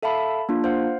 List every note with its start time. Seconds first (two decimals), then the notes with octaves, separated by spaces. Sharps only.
0.03 A4 E5 F5 A5 B5
0.49 A#3 D4 F4
0.64 C5 F5 F#5